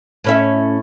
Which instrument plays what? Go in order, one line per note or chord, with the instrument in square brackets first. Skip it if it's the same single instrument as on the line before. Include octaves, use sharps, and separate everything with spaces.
[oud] A2 C#4 E5